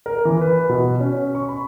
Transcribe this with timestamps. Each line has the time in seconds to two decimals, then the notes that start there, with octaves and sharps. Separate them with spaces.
0.06 A#4
0.25 E3
0.41 B4
0.69 B2
1.00 C#4
1.35 C#6
1.49 B5